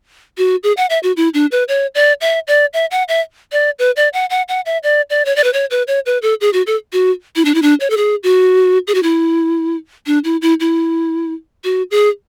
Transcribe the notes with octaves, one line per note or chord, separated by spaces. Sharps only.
F#4
G#4
F#5
E5
F#4
E4
D4
B4
C#5
D5
E5
D5
E5
F#5
E5
D5
B4
D5
F#5
F#5
F#5
E5
D5
D5
C#5
D5
B4
C#5
B4
C#5
B4
A4
G#4
F#4
A4
F#4
E4
D4
E4
D4
C#5
A4
G#4
F#4
G#4
F#4
E4
D4
E4
E4
E4
F#4
G#4